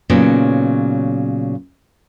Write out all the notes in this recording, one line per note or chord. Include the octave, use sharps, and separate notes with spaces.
A#2 C#3 F#3 B3 D#4